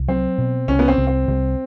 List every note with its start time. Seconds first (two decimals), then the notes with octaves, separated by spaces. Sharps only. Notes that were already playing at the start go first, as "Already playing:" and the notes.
Already playing: C2
0.08 F#3 C4
0.38 B2
0.68 C2 C#4
0.79 B3
0.88 C4
0.98 C2
1.07 C4
1.28 C2